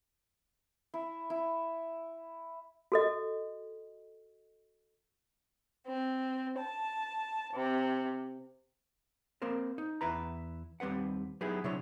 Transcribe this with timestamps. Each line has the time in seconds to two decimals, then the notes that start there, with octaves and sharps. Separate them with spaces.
0.94 E4
1.30 E4
2.92 F#4 A4 D#5
5.85 C4
6.58 A5
7.52 C3
9.42 A#3 C4 A#4 C5
9.78 D#4
10.01 E2 E4 B4 A#5
10.80 D#2 G3 C4 B4 F#5
11.41 F#3 B3 D#4 E4 G4 G#4
11.64 C3 F#3 D4 E4 C#5